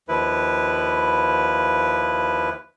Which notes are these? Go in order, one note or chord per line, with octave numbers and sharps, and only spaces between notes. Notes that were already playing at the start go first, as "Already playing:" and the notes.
D#2 F3 E4 B4